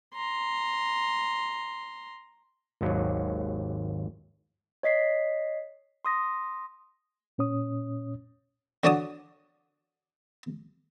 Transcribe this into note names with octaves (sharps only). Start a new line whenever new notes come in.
A#5 C6
G#1 D#2 F#3
C#5 D#5 B6 C7
C6 D#6 A#6
A#2 C#4 C#5 D#6
D3 F#4 C#5 D5 A5 D#6